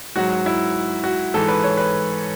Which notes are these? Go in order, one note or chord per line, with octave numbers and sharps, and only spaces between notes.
G#2 F#3 F#4
E4
F#4
G#2 E3 A4
B4
C#5
B4